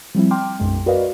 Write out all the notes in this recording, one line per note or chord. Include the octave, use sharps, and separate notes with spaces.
F3 G3 C4 E4
G5 A#5 C6 D6 F6
B1 F#2 G#3
F#4 A#4 B4 D5 D#5 F5